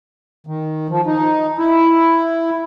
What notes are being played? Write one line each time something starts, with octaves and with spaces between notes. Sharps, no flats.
D#3
F3
D#4
E4